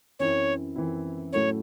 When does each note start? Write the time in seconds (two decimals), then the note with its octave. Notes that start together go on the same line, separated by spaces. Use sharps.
0.19 F#2 E3 C4 E4 C#5
0.76 F#2 E3 C4 E4
1.33 A2 F#3 A3 C#4 E4 C#5